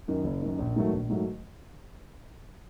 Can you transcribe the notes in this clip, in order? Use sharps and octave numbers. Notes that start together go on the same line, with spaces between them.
F#2 D#3
F#1
F#2 D#3
A#1
G#2 D#3 F#3 A3
A#1
G#2 D#3 F#3 A3